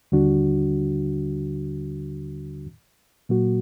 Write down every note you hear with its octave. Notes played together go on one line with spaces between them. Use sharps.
D#2 D3 G3 D4 F#4
A#2 F#3 A#3 F#4